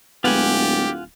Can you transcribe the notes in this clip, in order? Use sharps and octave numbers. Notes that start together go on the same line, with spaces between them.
D1 G#3 B3 F4 G4 F#5 G#5